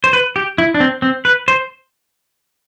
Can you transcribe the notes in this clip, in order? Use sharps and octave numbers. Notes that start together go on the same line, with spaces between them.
C5
B4
G4
E4
D4
C4
C4
B4
C5